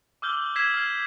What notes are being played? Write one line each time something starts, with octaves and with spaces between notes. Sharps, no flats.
D6 E6 F6 G6 F#7 G7
E6 G#6 B6 C7 E7
F6 G#6 C7